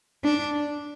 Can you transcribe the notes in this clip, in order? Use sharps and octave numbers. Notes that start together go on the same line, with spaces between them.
D4